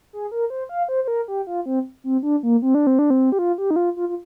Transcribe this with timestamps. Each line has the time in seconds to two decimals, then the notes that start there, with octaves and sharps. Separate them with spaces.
0.13 G#4
0.32 A#4
0.50 C5
0.69 F5
0.89 C5
1.04 C5
1.08 A#4
1.28 G4
1.47 F4
1.66 C4
2.04 C4
2.23 D4
2.43 A#3
2.62 C4
2.75 D4
2.87 C4
2.99 D4
3.10 C4
3.32 G4
3.39 F4
3.58 G4
3.71 D#4
3.76 F4
3.96 F4
4.09 F4